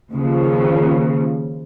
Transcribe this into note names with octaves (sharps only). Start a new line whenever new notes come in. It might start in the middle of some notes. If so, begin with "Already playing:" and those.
D#2 C#3 F3